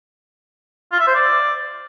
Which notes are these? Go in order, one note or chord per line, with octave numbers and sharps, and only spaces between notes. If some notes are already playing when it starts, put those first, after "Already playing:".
F4
E5
C5
D5